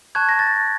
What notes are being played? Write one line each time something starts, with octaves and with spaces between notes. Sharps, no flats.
A5 C#6 F#6 G#6
A#6
A6